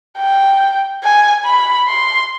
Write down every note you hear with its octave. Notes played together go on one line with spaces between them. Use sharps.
G5
G#5
B5
C6